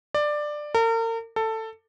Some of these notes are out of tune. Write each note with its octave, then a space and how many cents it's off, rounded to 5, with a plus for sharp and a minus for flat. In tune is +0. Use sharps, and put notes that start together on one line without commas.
D5 +15
A#4 -40
A4 +15